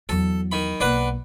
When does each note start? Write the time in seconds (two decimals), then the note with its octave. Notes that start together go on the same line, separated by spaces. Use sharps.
0.09 E2 F#3 A4
0.52 D#3 B5
0.80 B1 A#3 D4 B4 F#5